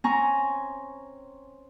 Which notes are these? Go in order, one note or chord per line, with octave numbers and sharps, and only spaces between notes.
C4 C#4 G#5 A#5 C#6